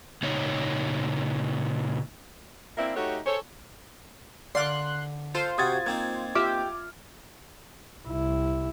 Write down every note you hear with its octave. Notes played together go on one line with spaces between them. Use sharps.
A#2 C#3 D#4 C#5
A#3 C4 D4 E4
A3 D#4 F#4 G4 A4 C#5
G#4 A4 C5 C#5
D3 D5 F5 C6 F#6
F4 A4 C5
C3 F#4 D#6 G#6 A6
A#3 C4 D#4 G#6
F4 G4 E5 D6 E6 F6
C2 E4